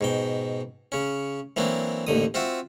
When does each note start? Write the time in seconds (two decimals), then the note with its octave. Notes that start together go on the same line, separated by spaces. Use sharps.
0.01 G#2 B2 G5
0.92 C#3 C#4
1.57 E3 F#3 A#3 C4 D4
2.07 A1 D#2 D3 D#6
2.34 C4 F4 F#4 E5